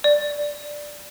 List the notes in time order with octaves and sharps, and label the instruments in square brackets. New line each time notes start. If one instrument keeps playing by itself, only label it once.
[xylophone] D5